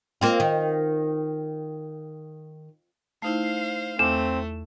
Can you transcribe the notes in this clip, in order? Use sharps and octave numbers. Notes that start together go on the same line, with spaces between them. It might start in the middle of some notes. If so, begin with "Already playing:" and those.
A#3 C4 F4
D#3
A3 D#4 E4 C5 F5
E2 A3 C4 D6 F6 E7